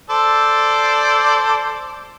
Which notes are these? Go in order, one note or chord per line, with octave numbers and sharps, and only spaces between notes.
A4 C5 D5